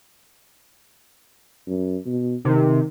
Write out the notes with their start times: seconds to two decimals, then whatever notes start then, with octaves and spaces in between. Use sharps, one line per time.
1.67 F#2
2.06 B2
2.45 C3 D#3